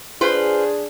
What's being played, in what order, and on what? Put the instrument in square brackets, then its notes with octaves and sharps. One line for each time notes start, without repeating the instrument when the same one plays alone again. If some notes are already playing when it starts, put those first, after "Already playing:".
[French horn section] D4 G#4 [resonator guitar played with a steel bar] F4 B4 C5